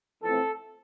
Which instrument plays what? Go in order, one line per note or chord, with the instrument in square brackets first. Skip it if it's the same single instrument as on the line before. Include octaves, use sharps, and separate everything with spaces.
[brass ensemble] F2 E3 A3 C4 A4